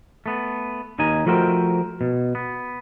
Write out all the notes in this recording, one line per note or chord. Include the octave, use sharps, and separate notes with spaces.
A3 B3
D#2 D#4 G#5
F3 A3 F#4 A#4 C5 G5
B2
B3